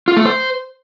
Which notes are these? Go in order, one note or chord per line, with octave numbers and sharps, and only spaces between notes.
F4
A3
C5